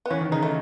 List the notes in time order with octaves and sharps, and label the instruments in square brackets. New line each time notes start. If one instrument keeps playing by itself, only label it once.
[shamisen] B3
[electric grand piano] E3 [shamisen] C#4
[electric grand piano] D#3
[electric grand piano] C#3 [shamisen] D#4
[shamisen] A3